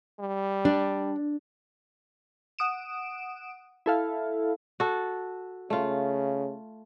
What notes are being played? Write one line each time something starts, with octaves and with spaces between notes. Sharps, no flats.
G3
D4
F#5 D#6 D7 E7
E4 A4 F5
F#4 A4
C#3 A3 F4